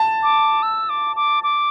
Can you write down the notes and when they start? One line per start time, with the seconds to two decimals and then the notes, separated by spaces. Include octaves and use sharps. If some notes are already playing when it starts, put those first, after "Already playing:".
Already playing: A5
0.23 D6
0.63 E6
0.89 D6
1.16 D6
1.43 D6